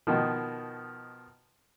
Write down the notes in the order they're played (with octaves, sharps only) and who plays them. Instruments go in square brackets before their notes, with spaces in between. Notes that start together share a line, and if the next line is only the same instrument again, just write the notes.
[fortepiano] B2 D#3 F3